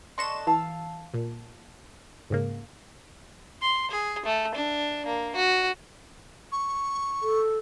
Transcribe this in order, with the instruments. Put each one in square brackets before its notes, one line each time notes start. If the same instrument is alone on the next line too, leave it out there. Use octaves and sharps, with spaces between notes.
[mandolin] D4 A4 D#5 [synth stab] C6 C#6 E7
[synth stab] E3 [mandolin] F5 A5 E6
[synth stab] A#2
G#2 C#3 A#3
[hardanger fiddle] C6
G#4
A3
D4
A#3
F#4
[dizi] C#6
[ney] A4